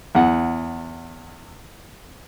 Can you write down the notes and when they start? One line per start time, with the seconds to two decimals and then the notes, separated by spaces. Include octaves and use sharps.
0.15 E2 F#5